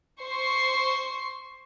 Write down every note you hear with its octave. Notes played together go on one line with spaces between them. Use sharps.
C5 C#6 C7